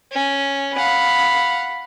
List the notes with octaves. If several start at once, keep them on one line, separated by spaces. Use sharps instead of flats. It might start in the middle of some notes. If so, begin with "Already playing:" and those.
C#4
F5 F#5 B5